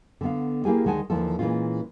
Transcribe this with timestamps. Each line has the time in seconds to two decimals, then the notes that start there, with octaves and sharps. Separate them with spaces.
0.21 D3 B3 F5
0.65 A#3 E4 G4 G#4 F5 G#5
0.85 D2 D#3 G#3 F#5 G#5 A5
1.10 D#2 D3 E3 F3 F4 A4
1.39 A#2 E3 G#3 C#4 F4